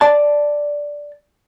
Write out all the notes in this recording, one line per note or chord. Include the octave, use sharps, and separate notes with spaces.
D5 A5